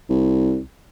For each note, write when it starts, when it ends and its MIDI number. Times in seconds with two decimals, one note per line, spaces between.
0.10 0.60 36